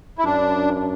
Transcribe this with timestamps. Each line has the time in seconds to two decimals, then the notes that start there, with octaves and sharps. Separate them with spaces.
0.18 E4
0.24 F#2 D4